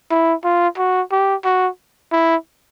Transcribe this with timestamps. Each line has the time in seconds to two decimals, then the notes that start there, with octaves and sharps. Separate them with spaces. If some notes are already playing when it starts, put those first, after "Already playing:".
0.10 E4
0.44 F4
0.78 F#4
1.12 G4
1.45 F#4
2.12 E4